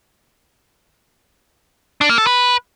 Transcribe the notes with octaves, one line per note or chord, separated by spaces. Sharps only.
D4
A#3
A4
B4